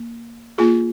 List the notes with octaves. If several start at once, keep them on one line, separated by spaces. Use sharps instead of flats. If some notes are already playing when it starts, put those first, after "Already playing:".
Already playing: A#3
A#3 F4 G#4